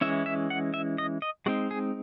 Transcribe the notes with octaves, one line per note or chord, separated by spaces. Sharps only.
E3 G#3 C#4 E4 E5
E5
F#5
E5
D#5
D#5
G#3 C4 D#4 F#4
G#4